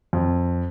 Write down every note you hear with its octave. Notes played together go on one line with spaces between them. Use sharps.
F2